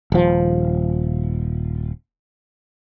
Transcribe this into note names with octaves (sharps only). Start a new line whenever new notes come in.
D#1 F3